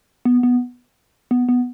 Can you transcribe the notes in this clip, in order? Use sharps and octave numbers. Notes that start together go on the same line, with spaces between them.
B3
B3
B3
B3